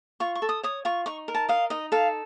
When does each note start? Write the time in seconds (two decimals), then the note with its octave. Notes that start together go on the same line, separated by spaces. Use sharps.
0.20 F4 C#6
0.35 C#6
0.42 A4
0.49 D#6
0.63 C#5 D#6
0.85 F4 C#6
1.06 D#4 C#6
1.28 A#4
1.35 A5
1.49 D#5 F5
1.70 D#4 D#5
1.92 A4 F5